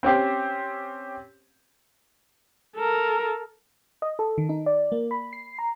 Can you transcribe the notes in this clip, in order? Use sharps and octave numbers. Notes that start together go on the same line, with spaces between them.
C4 C#4 G4 C5
A4 A#4
D#5
A4
D#3
D#4
D5
A#3
B5
C7
A#5